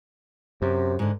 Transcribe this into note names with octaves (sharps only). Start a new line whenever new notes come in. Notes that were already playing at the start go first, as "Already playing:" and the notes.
F#2 C3
G#2 D3